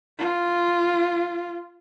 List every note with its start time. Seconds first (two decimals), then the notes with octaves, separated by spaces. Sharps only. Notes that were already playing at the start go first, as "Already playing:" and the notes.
0.18 F4